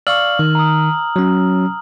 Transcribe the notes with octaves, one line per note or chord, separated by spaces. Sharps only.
D5 F5 C#6 E6 F6 F#7
D#3
A#5 D#6
F#3 C#4